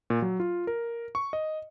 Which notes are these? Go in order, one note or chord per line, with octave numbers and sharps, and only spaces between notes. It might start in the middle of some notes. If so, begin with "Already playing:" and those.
A#2
F#3
F4
A#4
C#6
D#5